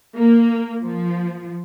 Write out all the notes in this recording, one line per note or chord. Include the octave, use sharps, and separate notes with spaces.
A#3
F3